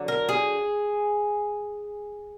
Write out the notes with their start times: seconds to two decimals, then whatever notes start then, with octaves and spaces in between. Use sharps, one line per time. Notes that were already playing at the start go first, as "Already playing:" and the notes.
Already playing: D3 F#3
0.08 A#4
0.29 G#4